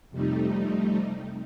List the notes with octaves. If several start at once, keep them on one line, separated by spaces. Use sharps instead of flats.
F2 C3 G3 A3 D#4